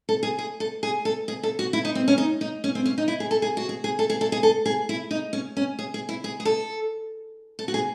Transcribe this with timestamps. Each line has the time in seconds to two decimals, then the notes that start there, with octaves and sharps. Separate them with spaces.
0.09 A4
0.23 G#4
0.39 G#4
0.60 A4
0.83 G#4
1.05 A4
1.28 G#4
1.43 A4
1.59 F#4
1.73 E4
1.85 D#4
1.95 C4
2.08 C#4
2.18 D#4
2.41 D#4
2.64 C#4
2.75 C4
2.86 C#4
2.98 D#4
3.08 E4
3.20 G#4
3.31 A4
3.42 G#4
3.57 F#4
3.69 G#4
3.84 G#4
3.99 A4
4.10 G#4
4.21 A4
4.32 G#4
4.43 A4
4.66 G#4
4.89 E4
5.11 D#4
5.33 C#4
5.57 C#4
5.79 G#4
5.94 G#4
6.09 E4
6.24 G#4
6.40 G#4
6.45 A4
7.59 A4
7.68 F#4
7.74 G#4